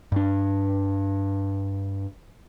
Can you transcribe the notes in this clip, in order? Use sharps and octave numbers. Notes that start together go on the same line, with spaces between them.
G2 D4